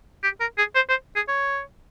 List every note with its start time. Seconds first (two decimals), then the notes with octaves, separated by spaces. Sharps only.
0.23 G4
0.40 A#4
0.58 G#4
0.75 C5
0.89 C5
1.16 G#4
1.28 C#5